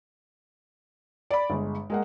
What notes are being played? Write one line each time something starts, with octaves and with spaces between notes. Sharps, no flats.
D5 B5
G1 G#3
G#3 A#3 F#5